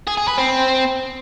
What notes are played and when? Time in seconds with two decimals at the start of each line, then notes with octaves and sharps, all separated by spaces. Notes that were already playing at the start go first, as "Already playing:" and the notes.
0.07 G#4
0.17 G#4
0.28 B4
0.38 C4